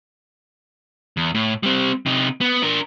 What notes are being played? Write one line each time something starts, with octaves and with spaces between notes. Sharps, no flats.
E2
A2
G3 C4
C3 D#4
B3
D4 A#4